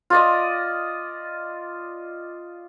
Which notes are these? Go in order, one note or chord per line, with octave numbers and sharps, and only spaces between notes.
F4 D5 D#5